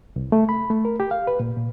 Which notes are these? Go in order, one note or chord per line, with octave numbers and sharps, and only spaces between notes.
C2
A3
B5
A3
A#4
G4
F5
B4
A#2
A#2